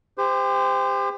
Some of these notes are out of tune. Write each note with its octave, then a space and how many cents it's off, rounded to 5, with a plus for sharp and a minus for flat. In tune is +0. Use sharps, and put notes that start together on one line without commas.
G4 +30 C5 -25